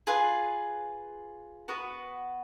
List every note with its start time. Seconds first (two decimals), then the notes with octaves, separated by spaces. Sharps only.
0.07 F4 G#4 B4
1.68 B3 F#4 B4